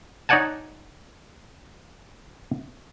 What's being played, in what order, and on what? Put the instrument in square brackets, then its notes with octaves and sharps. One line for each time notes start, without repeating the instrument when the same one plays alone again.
[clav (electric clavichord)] D#4 C#5 D5 F#5 G#5 A5